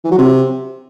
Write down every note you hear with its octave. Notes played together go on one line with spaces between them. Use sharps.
E3
F#3
C3